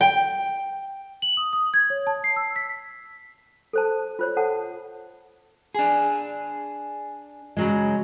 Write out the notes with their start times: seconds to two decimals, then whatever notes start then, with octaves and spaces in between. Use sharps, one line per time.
0.01 G5
1.22 F#7
1.37 D#6
1.53 D#6
1.74 G#6
1.90 C#5
2.07 A5
2.24 C7
2.36 E6
2.56 B6
3.73 A4 C5 A5
4.19 F4 C5 C#5
4.37 A4 F#5 A5
5.75 D4 G#4
7.57 C#3 F#3 G#3